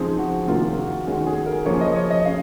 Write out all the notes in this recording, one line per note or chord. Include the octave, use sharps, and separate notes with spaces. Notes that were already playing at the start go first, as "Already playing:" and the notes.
Already playing: C#3 F3 G#3 C4 D#4 G#4
F#4
C3 D#3 A#3 C#4 F4
F#4
D#3 G#3 C#4 F#4
G#4
A#4
C#3 F3 A#3 C#4 C#5
D#5
C#5
D#5
C#3 F5